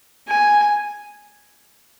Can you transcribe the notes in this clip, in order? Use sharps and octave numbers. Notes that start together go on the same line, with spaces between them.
G#5